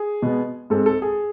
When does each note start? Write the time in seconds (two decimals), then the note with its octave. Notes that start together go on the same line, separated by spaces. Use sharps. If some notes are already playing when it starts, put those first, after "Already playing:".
Already playing: G#4
0.22 B2 G#3 B3
0.70 G#2 G#3 C4 A4
0.86 A4
1.02 G#4